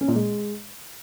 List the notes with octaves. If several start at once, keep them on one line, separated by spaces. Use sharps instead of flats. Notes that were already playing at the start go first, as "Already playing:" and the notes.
C#4
A#2
G#3